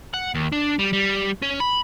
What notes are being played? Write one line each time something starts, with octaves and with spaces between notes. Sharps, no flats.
F#5
D#2
D4
G3
G3
C#4
B5